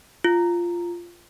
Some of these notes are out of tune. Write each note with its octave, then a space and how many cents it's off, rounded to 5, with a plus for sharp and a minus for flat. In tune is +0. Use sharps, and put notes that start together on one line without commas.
F4 -10